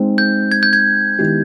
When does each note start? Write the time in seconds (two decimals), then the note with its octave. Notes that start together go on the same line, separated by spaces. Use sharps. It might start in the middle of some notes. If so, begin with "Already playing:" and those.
Already playing: G#3 C4 D#4
0.18 G6
0.52 G#6
0.63 G6
0.73 G#6
1.19 D#3 G#3 B3 E4 G4